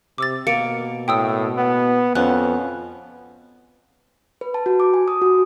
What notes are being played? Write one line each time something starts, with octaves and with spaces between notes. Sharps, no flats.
C3 D6 E6 A6
B2 A#3 C#7 D7
A2 G5 D#6 E6
B3
F2 B3 C#4 F#6
B4
A5
F#4
D6
G#5
D#6
F#4